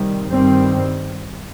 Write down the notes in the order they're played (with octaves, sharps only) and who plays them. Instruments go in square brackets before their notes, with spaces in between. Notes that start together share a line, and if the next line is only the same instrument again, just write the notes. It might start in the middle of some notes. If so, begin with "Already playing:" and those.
Already playing: [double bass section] C3 D#3 G3
G2 D#3 G3 C4